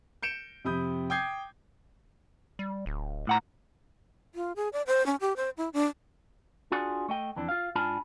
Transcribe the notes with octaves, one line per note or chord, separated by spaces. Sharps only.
G6 C#7 D7 E7
F2 C3 B5 D#6 G6
G5 D6 D#6 G6 G#6 C7
G3
D1
A2 F#5 A#5
F4
G#4
D5
C5
C#4
G4
C5
E4
D4
D4 F4 F#4 G#4 D5 F#5
A3 D#5 G5
F2 E3 D4
F4 F5
G#2 D4 F4 G#5 A5 B5